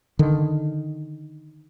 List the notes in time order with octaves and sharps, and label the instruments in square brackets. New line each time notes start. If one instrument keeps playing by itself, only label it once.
[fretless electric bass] D3 D#3